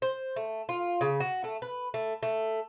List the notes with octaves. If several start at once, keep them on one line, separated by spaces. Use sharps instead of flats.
C5
A3
F4
C#3
F#4
A3
B4
A3
A3